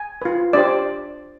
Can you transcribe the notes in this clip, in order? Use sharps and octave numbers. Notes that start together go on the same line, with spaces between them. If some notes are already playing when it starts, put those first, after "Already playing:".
Already playing: G#5
F4 B4
D4 G4 C5 D5